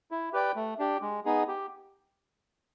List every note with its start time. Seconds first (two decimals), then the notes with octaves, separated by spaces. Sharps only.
0.11 E4
0.33 G4 B4 D5 G5
0.56 A3
0.79 D4 G4
1.02 G#3
1.25 B3 D#4 G#4
1.48 G4